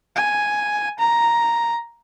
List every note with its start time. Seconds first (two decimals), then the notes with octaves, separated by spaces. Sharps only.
0.16 G#5
0.99 A#5